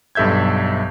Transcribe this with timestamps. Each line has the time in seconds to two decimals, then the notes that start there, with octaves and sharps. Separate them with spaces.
0.15 B1 G2 A4 E5 G6 G#6